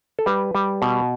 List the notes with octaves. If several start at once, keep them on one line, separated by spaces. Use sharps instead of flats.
A4
G3 B4
G3
B2